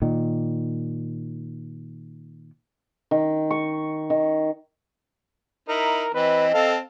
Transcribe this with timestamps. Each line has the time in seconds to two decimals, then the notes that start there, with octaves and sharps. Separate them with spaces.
0.02 A#2 D#3
3.11 D#3
3.51 C#6
4.10 D#3
5.69 D#4 E4 A#4
6.14 E3 C4 B4 D#5
6.54 C4 A4 F5 A5